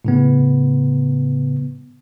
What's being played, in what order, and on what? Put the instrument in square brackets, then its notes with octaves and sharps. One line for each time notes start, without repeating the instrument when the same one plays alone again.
[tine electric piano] A2 C#3 B3